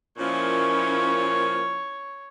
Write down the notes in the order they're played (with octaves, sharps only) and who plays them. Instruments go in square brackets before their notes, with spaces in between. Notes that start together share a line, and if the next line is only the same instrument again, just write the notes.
[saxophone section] A#2 F3 A#3 [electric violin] C#4 E4 [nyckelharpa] C#5